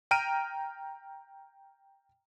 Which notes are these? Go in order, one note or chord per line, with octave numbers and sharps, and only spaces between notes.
G5 A#5 F6 D7 D#7